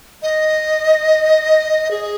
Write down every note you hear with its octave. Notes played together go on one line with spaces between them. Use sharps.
D#5
G#4